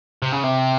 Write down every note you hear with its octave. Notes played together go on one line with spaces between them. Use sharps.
C3
C#3
C3